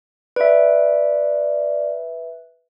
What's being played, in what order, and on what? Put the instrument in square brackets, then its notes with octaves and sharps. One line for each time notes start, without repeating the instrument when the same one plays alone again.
[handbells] B4 E5 [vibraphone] D5